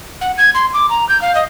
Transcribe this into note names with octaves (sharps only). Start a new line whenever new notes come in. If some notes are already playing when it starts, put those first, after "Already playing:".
F#5
G#6
C6
D6
A#5
G6
F5
D#5